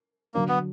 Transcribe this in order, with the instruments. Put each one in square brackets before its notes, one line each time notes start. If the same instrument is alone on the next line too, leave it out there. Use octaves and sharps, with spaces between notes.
[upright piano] D3 F#3 D4 [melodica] A#3
[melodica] B3